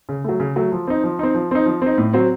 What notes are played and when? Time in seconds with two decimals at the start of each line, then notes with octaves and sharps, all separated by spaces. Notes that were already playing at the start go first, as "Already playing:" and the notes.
0.09 C#3
0.24 F#3 A3
0.40 C#3
0.56 F#3 A3
0.72 F3
0.87 C4 D#4
1.04 F3
1.19 C4 D#4
1.34 F3
1.51 C4 D#4
1.66 F3
1.82 C4 D#4
1.98 A2
2.13 F#3 C4